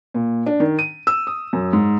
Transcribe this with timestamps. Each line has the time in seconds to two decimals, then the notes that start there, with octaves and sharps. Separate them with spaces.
0.14 A#2
0.46 D4
0.60 D#3
0.79 D#7
1.07 E6
1.27 D#6
1.53 F#2
1.73 G#2